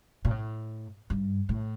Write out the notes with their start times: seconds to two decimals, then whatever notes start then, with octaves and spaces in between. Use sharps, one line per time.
0.25 A#2
0.31 A2
1.10 G2
1.49 A2